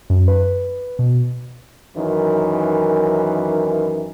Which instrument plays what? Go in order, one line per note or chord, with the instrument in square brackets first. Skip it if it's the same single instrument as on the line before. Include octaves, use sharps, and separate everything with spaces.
[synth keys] F#2
B4
B2
[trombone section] F#2 D#3 E3